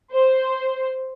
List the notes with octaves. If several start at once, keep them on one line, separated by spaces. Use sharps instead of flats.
C5